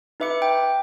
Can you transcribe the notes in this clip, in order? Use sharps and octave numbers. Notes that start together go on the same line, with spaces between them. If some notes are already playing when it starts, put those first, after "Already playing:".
D#4 B4 E5 D6 C#7
G5